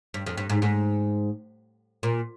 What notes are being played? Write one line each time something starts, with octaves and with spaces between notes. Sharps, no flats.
G2
F2
G2
G#2
G#2
A#2